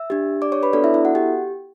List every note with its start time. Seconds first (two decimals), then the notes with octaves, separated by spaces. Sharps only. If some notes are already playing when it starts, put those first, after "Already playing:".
Already playing: E5 E6
0.10 D4 G4
0.42 D5 D6
0.52 C#5 C#6
0.63 B4 B5
0.73 B3 D4 F#4 A4 D5
0.84 E4 E5
0.94 E4 E5
1.05 F#4 F#5
1.15 G4 G5